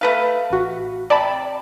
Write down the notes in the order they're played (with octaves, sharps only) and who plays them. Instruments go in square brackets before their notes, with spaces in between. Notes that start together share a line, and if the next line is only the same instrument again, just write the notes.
[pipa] A3 B4 F5
[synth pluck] A1 F#4
[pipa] C3 [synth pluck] D5 A5 B5